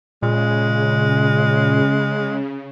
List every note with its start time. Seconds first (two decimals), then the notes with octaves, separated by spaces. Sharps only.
0.23 A#2 C#3 G#3